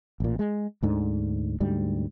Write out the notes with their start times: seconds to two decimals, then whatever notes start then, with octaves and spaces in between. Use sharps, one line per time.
0.20 A1 A#2
0.39 G#3
0.83 D2 G#2 D3
1.60 D2 G#2 G3